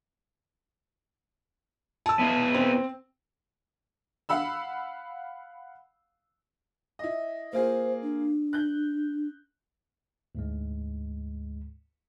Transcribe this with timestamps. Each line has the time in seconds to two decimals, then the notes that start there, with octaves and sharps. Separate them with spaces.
2.06 A5 E6
2.19 B3 E4 F5
2.54 C4
4.29 F5 F#5 B5 E6
6.99 E4 D#5
7.53 A#3 F4 G#4 C5
8.02 D4
8.53 F#6 G6
10.35 D2 G#2 G#3